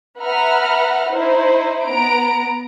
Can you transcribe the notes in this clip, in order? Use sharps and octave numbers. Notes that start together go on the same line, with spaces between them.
B4 E5 F#5 A#5 F6
D#4 E4 C5
B3 A#5 D7